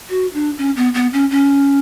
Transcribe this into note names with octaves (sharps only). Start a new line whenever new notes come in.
F#4
D4
C#4
B3
B3
C#4
C#4